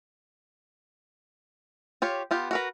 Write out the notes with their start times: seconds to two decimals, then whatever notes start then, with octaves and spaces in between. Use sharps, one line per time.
2.02 F4 G4 C#5
2.31 B3 F4 G4
2.51 F#4 A#4 B4